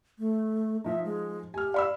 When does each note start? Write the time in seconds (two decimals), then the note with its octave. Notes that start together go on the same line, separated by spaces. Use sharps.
0.19 A3
0.84 F3 D#4 E5
1.04 G#3
1.54 G4 G#5 F6
1.74 D5 F5 B5 E6